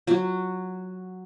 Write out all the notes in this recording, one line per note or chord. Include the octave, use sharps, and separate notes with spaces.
F#3 F#4